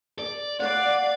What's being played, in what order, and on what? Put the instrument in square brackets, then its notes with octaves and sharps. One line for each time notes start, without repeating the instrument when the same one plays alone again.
[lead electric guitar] D5
[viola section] D5 [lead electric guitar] F5 [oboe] F#5